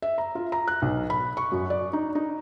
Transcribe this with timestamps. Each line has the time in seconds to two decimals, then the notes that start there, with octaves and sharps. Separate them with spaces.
0.02 E5
0.18 A#5
0.35 F4
0.52 A#5
0.68 F#6
0.82 B1
1.10 B5
1.37 C#6
1.52 F#2
1.70 D5
1.93 D#4
2.15 D#4